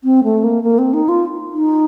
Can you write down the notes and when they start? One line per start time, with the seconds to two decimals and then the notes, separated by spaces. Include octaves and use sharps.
0.04 C4
0.24 A3
0.44 A#3
0.63 A#3
0.78 C4
0.93 D#4
1.09 F4
1.54 D#4